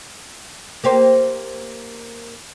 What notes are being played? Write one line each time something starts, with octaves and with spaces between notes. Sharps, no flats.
A#3 G4 C5